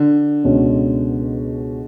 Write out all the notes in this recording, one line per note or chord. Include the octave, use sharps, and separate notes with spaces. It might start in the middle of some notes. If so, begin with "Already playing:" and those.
Already playing: D3
C#2 B2 G#3 C#4